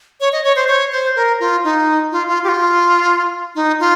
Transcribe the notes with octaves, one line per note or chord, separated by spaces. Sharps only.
C#5
D#5
C#5
C5
C#5
C5
A#4
F4
D#4
F4
F4
G4
F4
D#4
F4